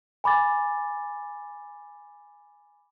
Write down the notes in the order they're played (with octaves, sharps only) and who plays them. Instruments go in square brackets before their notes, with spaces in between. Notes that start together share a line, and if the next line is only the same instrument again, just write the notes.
[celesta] G#5 B5 D6 A6